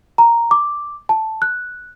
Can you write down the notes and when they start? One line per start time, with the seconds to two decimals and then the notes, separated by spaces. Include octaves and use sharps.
0.18 A#5
0.51 D6
1.09 A5
1.42 F#6